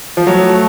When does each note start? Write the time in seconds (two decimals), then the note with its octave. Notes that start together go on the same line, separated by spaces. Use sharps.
0.17 F3
0.27 F#3 A3